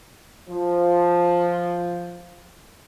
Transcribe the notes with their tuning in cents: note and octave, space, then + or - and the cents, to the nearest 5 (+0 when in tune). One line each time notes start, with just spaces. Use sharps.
F3 +0